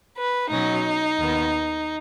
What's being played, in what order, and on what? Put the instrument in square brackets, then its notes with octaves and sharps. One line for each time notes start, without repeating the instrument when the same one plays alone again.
[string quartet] B4
B2 F#3 C#4 D#4
D#2 D#3 B3